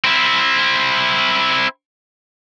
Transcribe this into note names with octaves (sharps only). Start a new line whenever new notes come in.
C4 E4